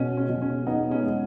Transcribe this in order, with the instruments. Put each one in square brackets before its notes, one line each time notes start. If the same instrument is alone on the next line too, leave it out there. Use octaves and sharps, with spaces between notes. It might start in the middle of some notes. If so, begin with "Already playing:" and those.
Already playing: [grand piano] B2 [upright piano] C#4
[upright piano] C#4
[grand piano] B2
[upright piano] C#4
[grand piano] B3 [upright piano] D#4
[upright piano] C#4
[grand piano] G#3